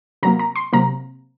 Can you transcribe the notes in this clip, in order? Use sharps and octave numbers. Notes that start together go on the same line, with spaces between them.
C3 F#3 A#3 A#5
A#5
C6
C3 F#3 A#3 A#5